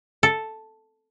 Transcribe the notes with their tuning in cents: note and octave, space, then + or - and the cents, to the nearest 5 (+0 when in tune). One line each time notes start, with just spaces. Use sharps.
A4 +0